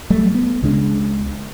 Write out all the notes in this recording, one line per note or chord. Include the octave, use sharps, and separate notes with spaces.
F#3 G3 A3
B3
C#2 C#3 G#3 D4